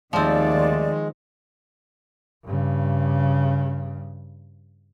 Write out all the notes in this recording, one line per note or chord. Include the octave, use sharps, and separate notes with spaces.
D#2 D#3 F3 G#3 A3 C4 D5
G2 C#3